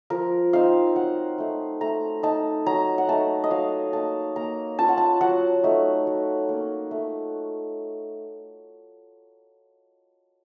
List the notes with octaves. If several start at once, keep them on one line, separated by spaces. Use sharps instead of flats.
F3 A#4
C4 D#4 F5
F#3 F#5
A3 D#4
A3 A#5
D#4 A5
F#3 A#5
F#5
A3 D#4 A5
D#5
F#3 F5
A#3 D#4 A5
A#3 A#5
C#4 F4 A5
F#5
A5
F#3 F#5
A3 D#4
F#3
A#3 C#4
A3